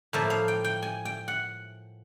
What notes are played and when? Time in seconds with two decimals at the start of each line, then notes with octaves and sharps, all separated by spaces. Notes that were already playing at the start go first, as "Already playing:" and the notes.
0.13 A2 F3 A#3 E5
0.30 F5
0.48 G5
0.64 G5
0.82 G#5
1.05 G5
1.28 F#5